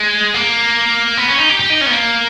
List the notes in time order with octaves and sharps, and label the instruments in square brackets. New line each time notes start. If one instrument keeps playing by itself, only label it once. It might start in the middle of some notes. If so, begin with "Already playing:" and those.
Already playing: [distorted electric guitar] G#3
A#3
B3
C#4
D#4
G4
G4
D#4
C#4
B3
A#3